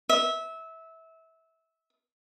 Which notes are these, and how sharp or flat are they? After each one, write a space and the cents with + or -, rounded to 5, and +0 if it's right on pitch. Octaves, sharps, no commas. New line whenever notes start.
E5 -20